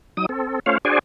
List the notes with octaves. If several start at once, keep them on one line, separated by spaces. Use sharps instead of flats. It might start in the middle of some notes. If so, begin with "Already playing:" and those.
F#3 D#4 D#6
C4 A4
A3 C#4 F4 C5 C#5 F5
D4 F#4 G#4 C5 D5 G#5